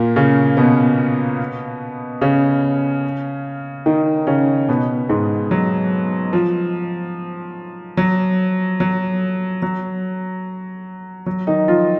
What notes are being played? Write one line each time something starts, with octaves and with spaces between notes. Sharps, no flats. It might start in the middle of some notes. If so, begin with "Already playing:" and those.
Already playing: A#2 A#3
C#3 C#4
B2 B3
C#3 C#4
D#3 D#4
C#3 C#4
B2 B3
G#2 G#3
F#3
F3
F#3
F#3
F#3
F#3
D#3 D#4
F3 F4